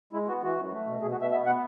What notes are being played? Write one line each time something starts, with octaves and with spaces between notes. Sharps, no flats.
G#3 E4
B3 F#4
E3 F#4
F#2
A3
B2
B2 G#4
F#4
B2 E5
B3 E5
B3 F#5